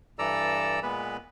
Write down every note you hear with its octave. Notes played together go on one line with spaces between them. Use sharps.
G2 E3 A4 D5 A#5 E6
A#2 G#3 B3 B4